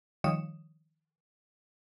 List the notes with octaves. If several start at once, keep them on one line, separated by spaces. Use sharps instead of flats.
D#3 F3 G3 C#5 D#6 E7